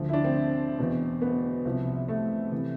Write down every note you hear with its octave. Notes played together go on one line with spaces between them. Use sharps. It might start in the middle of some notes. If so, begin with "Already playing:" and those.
Already playing: D2 D3 F3
E4
D4
C4
E2 B2
B3
C2 C3 F3
A3
C3 E3